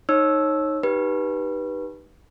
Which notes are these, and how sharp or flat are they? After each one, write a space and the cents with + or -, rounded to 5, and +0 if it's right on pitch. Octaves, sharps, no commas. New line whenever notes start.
D#4 +0 C#5 -30 E6 +0
D#4 -5 G4 +0 B4 -15